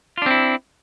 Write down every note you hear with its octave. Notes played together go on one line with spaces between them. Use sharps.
C4 D4 E4 F4